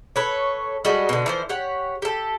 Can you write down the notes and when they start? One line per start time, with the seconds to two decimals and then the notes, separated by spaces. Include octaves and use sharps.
0.16 A4 B4 C#5
0.85 G3 G#3 F#4 A4
1.09 B2 D3
1.26 E3 F3 C5
1.49 G4 C#5 F#5
2.02 G4 A4